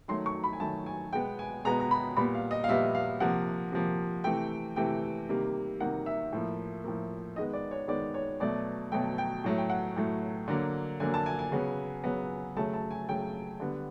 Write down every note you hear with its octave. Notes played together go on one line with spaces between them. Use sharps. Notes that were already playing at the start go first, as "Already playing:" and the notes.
D#3 F#3 A3 C6
C#6
B5
G#5
D#3 F#3 A3 A5
G#5
B2 G#3 B3 G5
G#5
B2 G#3 B3 A#5
A#5
B5
A#2 G3 B3 B5
F5
D#5
F5
A#2 G3 B3 E5
F5
C3 F3 A#3 F#5
C3 F3 A#3
C3 E3 A3 G5
C3 E3 A3 G5
C3 D#3 G3 A#3
C3 D#3 G3 A#3 F#5
E5
A2 F3 A#3
A2 F3 A#3
D#3 G#3 B3 D#5
D5
C#5
D#3 G#3 B3 D5
C#5
B2 F#3 A3 D5
B2 F#3 A3 G5
G5
A2 F#3 A3
G5
F#5
A2 F#3 A3
D3 F#3 A#3
D3 F#3 A#3 G#5
A5
G#5
G#5
C#3 F#3 B3
C#3 F#3 B3
C#3 F#3 A3 A5
A5
G#5
C#3 F#3 A3 G5
D3 G3 B3